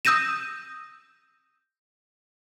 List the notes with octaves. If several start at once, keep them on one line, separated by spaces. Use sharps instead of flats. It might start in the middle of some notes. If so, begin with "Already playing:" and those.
D#6 E6 G6 A#6 D#7 E7